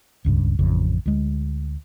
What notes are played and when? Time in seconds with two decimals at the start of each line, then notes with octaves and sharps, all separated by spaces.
0.25 D#1 C#2 G2 C#3
0.59 A1 F2 C#3
1.06 D2 G#3